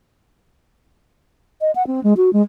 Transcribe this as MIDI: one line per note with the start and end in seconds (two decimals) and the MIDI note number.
1.61 1.71 75
1.76 1.86 78
1.87 2.03 60
2.04 2.14 56
2.17 2.32 66
2.33 2.42 56